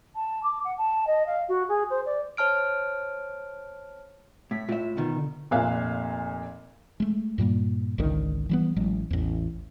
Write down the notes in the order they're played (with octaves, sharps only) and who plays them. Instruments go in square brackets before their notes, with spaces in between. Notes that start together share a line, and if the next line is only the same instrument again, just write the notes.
[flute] A5
D6
F#5
A5
D#5
F5
F#4
G#4
C5
D5
[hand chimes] C5 C#5 A5 F6 D7
[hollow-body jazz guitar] A2 [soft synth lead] B6
[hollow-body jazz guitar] A2 E5 [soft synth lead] F4
[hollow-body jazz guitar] B2 D#3
[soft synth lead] D3
[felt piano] F1 A#2 E5 F5 G#5 F#6
[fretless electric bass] G#3 A3
G2 A#2 G3 A#3
G#1 C#2 D3 D#3
E3 G3 B3
A1 F#3 G#3
A1 E2